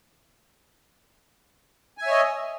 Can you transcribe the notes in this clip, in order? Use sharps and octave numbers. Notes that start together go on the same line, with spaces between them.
C#5 D#5 E5 G#5